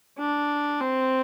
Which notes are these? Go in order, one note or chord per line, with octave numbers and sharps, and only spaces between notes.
D4
C4